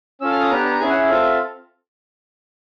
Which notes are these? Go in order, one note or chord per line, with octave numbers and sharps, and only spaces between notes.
C#4 F4 A4 E6
F6
D#6
B3 D4 G4 A#5
A#5
C#4 E4 G#4 G#5
F#5
E5
C4 F4 A4